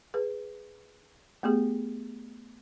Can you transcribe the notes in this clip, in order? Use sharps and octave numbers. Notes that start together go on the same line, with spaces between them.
G#4 B4
A3 B3 G4 G#4